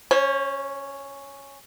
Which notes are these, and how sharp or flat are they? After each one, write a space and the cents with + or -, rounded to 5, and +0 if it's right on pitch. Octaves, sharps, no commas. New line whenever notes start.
C#4 +0 C5 +45